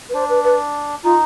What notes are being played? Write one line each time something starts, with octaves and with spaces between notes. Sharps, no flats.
B4
D4 C5
B4
B4
D#4 F4